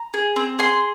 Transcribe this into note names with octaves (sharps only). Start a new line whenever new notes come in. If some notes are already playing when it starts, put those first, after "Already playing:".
Already playing: A#5
G#4
C4
G#4 C6